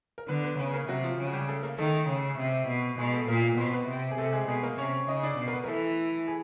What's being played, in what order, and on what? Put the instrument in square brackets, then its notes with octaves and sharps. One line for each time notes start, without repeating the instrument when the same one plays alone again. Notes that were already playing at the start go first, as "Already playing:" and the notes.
[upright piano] A#4
[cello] D3 [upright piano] B3 B4
[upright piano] B3 B4
[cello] C#3 [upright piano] B3 B4
[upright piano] A#3 A#4
[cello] C3 [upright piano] F#3 F#4
[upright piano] F3 F4
[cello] C#3
[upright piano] F#4
G3 G4
A3 A4
A#3 A#4
[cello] D#3 [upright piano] A3 A4
[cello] C#3
C3
B2
[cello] B2 [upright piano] G#3 G#4
[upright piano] A3 A4
[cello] A#2 [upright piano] A#3 A#4
[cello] B2 [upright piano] C4 C5
[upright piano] B3 B4
[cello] C3
[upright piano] G#4
[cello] C3 [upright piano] A3 A4
[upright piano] G#3 G#4
[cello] B2 [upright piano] G#3 G#4
[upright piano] A#3 A#4
[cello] C3 [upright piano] C#4 C#5
[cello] C#3 [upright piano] D#4 D#5
[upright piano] D4 D5
[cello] B2
[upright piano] A#4
B3 B4
A#4
[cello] E3 [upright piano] A3 A4
[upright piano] G#4